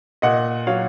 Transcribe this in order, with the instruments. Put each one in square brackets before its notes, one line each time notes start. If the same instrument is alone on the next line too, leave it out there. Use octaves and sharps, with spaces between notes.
[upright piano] A#2 D#5 F#5
F#3 C#5 F5